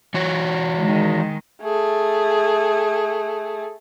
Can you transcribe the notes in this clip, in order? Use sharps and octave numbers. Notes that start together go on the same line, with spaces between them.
E3 F#4 C#5
D#3 G#3
A3 G#4